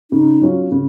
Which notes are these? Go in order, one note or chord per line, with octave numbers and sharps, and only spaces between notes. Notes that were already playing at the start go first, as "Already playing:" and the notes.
C#3 D#4
F#3 C#4 F4
C#3